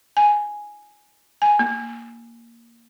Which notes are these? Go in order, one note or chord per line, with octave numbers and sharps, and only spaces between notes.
G#5
G#5
A#3